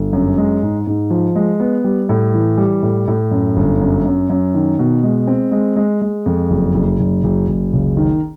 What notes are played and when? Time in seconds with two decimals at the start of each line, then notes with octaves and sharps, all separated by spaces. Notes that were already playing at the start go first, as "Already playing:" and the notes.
Already playing: G1
0.13 F#2
0.38 G#3
0.63 G#2
0.87 G#2
1.10 F3
1.35 G#3
1.60 B3
1.84 G3
2.09 A2
2.34 E3
2.57 G3
2.83 A2
3.08 A2
3.31 F#2
3.57 G1
3.81 F#2
4.05 F#2
4.30 F#2
4.54 D#3
4.79 B2
5.03 G#3
5.27 C4
5.52 G#3
5.76 G#3
6.02 G#3
6.26 F2
6.50 F#1
6.74 F#1
6.99 F#1
7.24 F#1
7.48 F#1
7.73 C#2
7.97 D#3